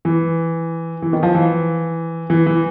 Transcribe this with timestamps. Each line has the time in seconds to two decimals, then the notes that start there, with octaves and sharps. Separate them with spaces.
0.05 E3
1.02 E3
1.13 D#3
1.23 F3
1.35 E3
2.30 E3
2.46 E3